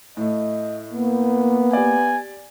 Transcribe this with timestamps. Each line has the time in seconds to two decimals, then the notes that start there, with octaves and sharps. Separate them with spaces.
0.17 A2 A3 D#5
0.92 A#3 B3
1.73 G4 D5 G#5